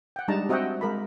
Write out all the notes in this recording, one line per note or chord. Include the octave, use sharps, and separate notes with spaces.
F#5 G5
G3 G#3 D4 D#4 A5 A#5
C4 F#4 D#5 E5 F#5 G5
G#3 A#4 B5